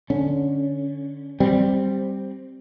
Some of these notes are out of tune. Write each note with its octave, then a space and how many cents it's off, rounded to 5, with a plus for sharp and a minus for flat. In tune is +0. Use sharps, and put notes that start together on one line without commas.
D3 +0 C#4 +10
G3 +0 C4 +5